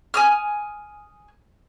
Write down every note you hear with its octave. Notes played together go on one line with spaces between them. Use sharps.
G#5 D#6 F6